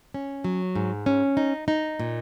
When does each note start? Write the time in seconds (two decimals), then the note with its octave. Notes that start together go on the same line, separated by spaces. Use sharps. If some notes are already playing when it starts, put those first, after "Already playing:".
0.14 C#4
0.44 F#3
0.75 G#2
1.06 C#4
1.37 D#4
1.68 D#4
2.00 A#2